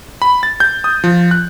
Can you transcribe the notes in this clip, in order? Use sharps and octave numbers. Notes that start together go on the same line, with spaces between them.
B5
A6
G6
D#6
F3
F#6